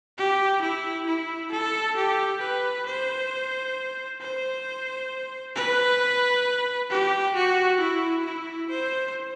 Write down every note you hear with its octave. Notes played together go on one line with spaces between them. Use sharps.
G4
E4
E4
A4
G4
B4
C5
C5
B4
G4
F#4
E4
E4
C5